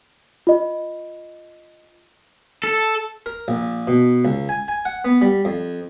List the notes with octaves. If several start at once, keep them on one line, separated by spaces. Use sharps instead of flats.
F4 D#5
A4
A#4
A#1
B2
C#2
G#5
G#5
F#5
B3
G3
F2